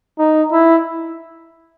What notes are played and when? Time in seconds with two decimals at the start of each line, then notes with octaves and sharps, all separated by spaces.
0.19 D#4
0.52 E4